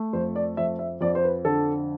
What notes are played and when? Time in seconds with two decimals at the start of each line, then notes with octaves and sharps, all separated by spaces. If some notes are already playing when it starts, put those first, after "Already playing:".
Already playing: A3
0.13 F2 C5
0.36 D5
0.57 F2 E5
0.79 E5
1.01 F2 D5
1.15 C5
1.24 B4
1.45 D3 A4